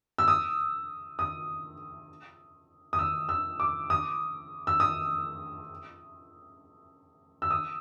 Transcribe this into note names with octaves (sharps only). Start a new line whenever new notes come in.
E6
D#6
D#6
D#6
E6
E6
D6
D#6
E6
D#6
E6
D#6